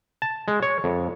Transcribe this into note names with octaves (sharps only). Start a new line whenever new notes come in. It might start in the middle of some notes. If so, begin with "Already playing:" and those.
A5
G#3
C#5
F2